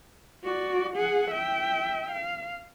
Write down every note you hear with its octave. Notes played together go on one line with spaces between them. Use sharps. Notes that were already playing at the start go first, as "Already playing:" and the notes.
F#4 D5
G#4 F#5
E5 G5
F5